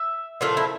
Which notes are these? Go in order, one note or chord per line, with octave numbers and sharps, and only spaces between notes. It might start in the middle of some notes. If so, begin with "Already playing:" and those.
Already playing: E5
A#2 F3 A3 F4
E4